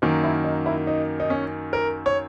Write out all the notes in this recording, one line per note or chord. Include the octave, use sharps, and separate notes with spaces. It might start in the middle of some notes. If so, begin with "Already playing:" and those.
F#2 D#3 A#3
E4
D#4
E4
D#4
D#4
C#4
A#4
C#5